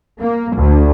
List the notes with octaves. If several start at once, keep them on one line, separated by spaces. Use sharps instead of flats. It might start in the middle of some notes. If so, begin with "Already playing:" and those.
A#3
D2